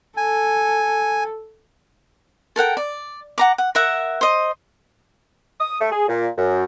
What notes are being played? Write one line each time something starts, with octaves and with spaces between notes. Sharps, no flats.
A4 G#5
A4 A#4 F#5 G5
D5
F#5 A#5 D6
F#5
A#4 E5 F#5
C5 D#5
D#6
A3
G#4
A#2
F#2